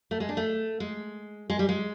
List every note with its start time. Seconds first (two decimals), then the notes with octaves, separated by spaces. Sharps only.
0.11 A3
0.20 G#3
0.29 D4
0.37 A3
0.80 G#3
1.50 G#3
1.59 G3
1.69 G#3